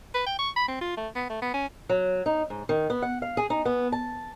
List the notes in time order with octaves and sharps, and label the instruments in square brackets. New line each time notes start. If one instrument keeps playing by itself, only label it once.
[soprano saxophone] B4
G5
C#6
B5
C4
F4
A3
B3
A3
B3
C#4
[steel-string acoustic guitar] F#3
D#4
G#2
D#3
B3
F#5
F5
G#4
D#4
B3
A5